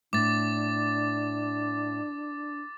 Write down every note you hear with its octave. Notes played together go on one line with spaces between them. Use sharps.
A2 D4 D6 A6